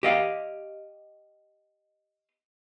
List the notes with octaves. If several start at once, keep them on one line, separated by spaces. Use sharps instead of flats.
G4 D#5 F5